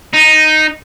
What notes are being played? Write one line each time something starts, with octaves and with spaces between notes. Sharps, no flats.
D#4